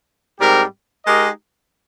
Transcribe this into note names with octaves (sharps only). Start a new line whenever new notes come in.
G#2 G3 C4 G4 A#4
G#3 D#4 G4 A#4 D#5